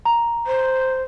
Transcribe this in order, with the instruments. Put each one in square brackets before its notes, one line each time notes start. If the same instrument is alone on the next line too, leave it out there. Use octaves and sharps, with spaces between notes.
[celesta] A#5
[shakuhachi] C5